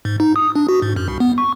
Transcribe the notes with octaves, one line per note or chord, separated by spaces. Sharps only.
G#2
D#4
D#6
D4
F#4
G#2
F#2
C2
B3
C#6